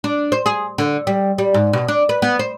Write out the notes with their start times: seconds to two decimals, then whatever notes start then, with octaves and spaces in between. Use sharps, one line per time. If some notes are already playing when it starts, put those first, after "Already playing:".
0.04 D4
0.32 C5
0.46 G#4
0.78 D3
1.07 G3
1.38 G3
1.54 G#2
1.73 B2
1.88 D4
2.09 B4
2.22 B3
2.39 C5